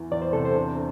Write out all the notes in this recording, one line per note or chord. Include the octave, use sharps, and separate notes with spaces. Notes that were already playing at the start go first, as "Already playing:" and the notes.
Already playing: E2 E3
E2 D5
C5
C3 A4
C5
D4